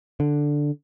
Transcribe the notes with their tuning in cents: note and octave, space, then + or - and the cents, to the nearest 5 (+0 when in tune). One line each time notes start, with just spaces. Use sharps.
D3 +0